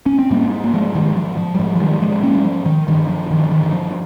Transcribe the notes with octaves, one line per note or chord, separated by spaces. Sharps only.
C#4
C4
G#2 G3 A#3
A#3
F3 G#3
D#3 G3
F3
F3
G3
G#2 F3
F3
D#3 G3
F3 G#3
A#3 C#4
G3
F3
D#3
G2 D#3
F3
D#3
D#3
D#3
F3